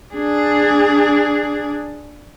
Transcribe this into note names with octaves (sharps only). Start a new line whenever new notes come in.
D4 G#4